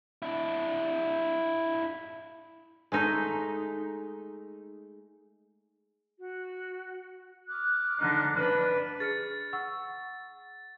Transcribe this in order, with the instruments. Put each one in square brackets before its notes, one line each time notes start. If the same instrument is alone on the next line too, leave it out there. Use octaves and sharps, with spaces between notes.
[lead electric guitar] D4 E4
[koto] G#3 A3 D#4
[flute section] F#4
D6 F6 F#6
[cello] D3 D#4
D4 B4
[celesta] G#4 F6 C#7 [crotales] A6
[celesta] F#5 C#6 E6